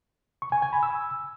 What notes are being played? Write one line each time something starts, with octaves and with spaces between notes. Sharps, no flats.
C#6
G#5
G#5
B5
E6